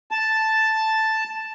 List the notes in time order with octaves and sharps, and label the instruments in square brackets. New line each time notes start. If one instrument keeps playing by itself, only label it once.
[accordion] A5